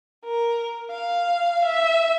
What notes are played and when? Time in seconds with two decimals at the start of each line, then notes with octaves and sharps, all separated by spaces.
0.24 A#4
0.91 F5
1.64 E5